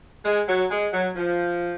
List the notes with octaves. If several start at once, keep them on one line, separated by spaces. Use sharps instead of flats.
G#3
F#3
G#3
F#3
F3